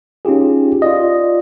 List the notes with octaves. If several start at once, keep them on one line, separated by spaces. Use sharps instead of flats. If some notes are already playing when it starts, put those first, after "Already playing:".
C#4 D#4 F4 G4 G#4
F4 D5 D#5